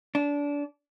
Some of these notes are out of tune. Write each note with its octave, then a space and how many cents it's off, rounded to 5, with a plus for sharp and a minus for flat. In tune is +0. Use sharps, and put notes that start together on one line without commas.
D4 -25